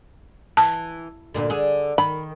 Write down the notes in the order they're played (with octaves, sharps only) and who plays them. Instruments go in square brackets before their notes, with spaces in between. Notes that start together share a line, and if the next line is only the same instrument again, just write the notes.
[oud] E3 [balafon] A5
[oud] D2 A#2 D3
D3 G#4
[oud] D#3 [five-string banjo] B5